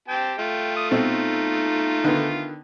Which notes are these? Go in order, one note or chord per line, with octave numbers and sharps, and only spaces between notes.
C4 G4 G5 A5
A3 F4
D#6
B2 C4 D#4 A4
D3 D#3 B3